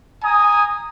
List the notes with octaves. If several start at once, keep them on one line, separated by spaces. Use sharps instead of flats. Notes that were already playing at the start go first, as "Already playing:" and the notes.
G#5 A#5 D#6